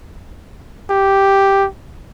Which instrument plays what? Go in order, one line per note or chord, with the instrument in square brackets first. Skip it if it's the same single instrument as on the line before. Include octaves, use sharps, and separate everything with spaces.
[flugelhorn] G4